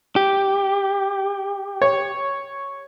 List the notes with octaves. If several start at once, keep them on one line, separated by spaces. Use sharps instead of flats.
G4
C#5